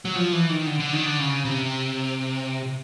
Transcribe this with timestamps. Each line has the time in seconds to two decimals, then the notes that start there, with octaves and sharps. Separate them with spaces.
0.05 F#3
0.15 F3
0.33 E3
0.49 D#3
0.67 D3
0.80 D3
0.93 D#3
1.06 D3
1.19 C#3
1.45 C3